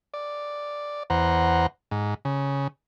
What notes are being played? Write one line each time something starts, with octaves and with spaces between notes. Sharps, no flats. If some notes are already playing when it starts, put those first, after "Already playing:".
D5
E2 C5 F#5 A#5
G#2
C#3